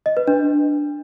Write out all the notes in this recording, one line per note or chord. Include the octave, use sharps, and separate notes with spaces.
D#5
B4
D4